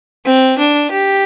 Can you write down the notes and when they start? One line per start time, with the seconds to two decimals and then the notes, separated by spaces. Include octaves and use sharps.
0.25 C4
0.58 D4
0.91 G4